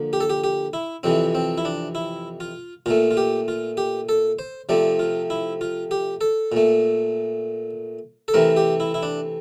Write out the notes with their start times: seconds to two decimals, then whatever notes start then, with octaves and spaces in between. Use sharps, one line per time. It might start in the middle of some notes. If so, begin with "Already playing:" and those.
Already playing: D3 F3 A#3
0.13 G4
0.20 A4
0.30 G4
0.44 G4
0.73 E4
1.03 F2 C3 E3 C4
1.35 C4
1.58 E4
1.65 D4
1.95 E4
2.40 F4
2.86 A#2 A3 F4
3.11 F4
3.17 G4
3.48 F4
3.77 G4
4.09 A4
4.39 C5
4.69 C3 F3 A3 D5
4.99 F4
5.30 E4
5.61 F4
5.91 G4
6.21 A4
6.52 A#2 A3
8.28 A4
8.34 C3 E3 A3 A#4
8.57 G4
8.80 E4
8.94 E4
9.03 D4